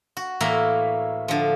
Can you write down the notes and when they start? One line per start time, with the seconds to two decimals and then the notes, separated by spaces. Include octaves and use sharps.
0.17 F#4
0.40 A2 E3 A#3 E4 A#5
1.28 D3 F3